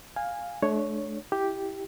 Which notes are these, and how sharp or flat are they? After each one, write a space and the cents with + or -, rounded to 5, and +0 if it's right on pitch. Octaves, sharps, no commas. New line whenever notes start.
F5 +10 G#5 -15
A3 -40 D4 +10 C#5 +0
E4 +0 G4 +0